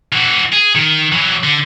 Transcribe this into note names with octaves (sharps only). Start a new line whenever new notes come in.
E3 F#4
G#4
D#3
E3 F#3
D3